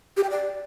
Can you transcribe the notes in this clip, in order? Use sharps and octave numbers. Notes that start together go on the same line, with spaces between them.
G4
G5
D5